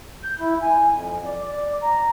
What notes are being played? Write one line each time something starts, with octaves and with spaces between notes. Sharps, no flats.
G6
E4
G#5
F2
D5
D5
A#5